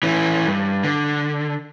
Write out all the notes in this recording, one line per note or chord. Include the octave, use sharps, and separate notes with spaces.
E3 C#4
G2
D3